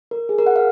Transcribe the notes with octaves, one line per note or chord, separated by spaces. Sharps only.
A#4
G#4
A#4
F#5
F5